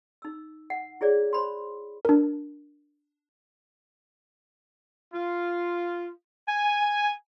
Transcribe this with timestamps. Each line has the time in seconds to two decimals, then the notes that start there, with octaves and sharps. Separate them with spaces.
0.22 D#4 E6
0.70 F#5
1.01 E4 G#4 C#5 D5
1.33 C5 B5 C6
2.05 D4 A#4
5.14 F4
6.48 G#5